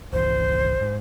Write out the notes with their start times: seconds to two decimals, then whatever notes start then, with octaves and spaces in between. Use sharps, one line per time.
0.13 G#1 C#2 E3 C5
0.81 G#2